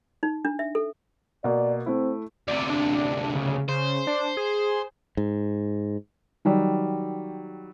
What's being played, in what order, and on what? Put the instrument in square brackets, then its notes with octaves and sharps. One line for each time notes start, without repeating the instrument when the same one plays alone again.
[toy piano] D#4
D4
E5
A4
[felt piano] B2 A#3 [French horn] D5
[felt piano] A3 E4 [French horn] C4
[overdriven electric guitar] D2 C3 [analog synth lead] D5
[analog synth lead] D4
C#3
[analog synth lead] C#3 [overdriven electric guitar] C5
[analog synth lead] D4
G#4
[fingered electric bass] G#2
[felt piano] D#3 F#3 G3